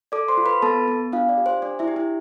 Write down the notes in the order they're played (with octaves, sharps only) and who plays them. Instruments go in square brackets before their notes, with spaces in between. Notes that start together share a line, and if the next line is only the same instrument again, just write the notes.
[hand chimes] A4 D5 D6
C5 C6
F4
B4 B5
B3 A4 A5
B3
D4 F4 F5
D5
G4
C5
D4 D5
E4 E5
G4
E4 E5